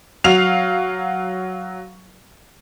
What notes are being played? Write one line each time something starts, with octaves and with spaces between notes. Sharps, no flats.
F#3 F5 F7